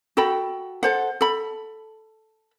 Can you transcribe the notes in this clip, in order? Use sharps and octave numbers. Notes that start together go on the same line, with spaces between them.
F#4 A4 G5 B5
A4 C5 F#5
A4 B5